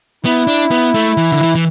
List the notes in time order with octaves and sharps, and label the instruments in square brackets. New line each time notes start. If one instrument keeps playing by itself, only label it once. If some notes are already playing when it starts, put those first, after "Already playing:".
[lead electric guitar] B3 [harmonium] E4
[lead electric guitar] D4
B3
A3
E3
D3
E3
E3